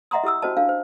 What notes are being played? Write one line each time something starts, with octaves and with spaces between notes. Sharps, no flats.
D#5 E5 F#5 A#5 C6 D#6
E4 G4 D#6 E6
C#4 F#4 C5 D#5 A5
D4 F5
C5